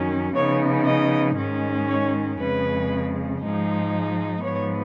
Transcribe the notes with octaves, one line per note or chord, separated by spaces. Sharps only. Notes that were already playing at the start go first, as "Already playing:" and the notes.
Already playing: F#2 D#3 F#3 C#4
C#3 F3 B3 D#4 C#5
D#5
G#2 D#3 G#3 C#4
C#5
F2 C#3 G#3 B4
G#2 F3 G#3 D#4
G#2 F3 B3 C#5